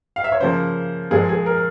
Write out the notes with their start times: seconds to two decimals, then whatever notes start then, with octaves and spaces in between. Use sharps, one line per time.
0.16 F5
0.24 E5
0.32 C#5
0.40 C#3 F3 A#3 C5
1.11 A#2 F3 G#3 G#4
1.29 G#4
1.46 A#4